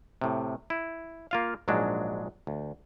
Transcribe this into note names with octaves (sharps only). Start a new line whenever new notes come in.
A2 C3
E4
A#3 F4 F5
A#1 G#2 F#3 G#3 D4
D2